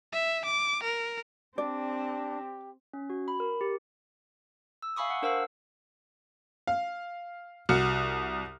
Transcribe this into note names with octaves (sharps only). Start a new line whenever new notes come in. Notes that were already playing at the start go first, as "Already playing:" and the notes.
E5
D6
A#4
C4 D4 G4 D5
C#4
F#4
B5
A#4
G4
E6
E5 F5 G#5 B5 C#6 D#6
F#5
D4 A#4 C5 F5 F#5 E6
F5
C2 F#4 F6 C#7